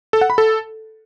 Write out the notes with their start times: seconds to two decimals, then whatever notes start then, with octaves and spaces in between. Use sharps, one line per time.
0.13 A4
0.21 F#5
0.30 B5
0.38 A4